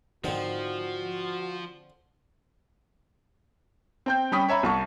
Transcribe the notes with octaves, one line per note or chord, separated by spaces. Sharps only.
G#2 D3 D#3 F3 C4 F#4
C4 G5 G6
G3 C#4 G5 B5 D#6 B6
C#5 E5 A#5 B5
C2 A5 C#6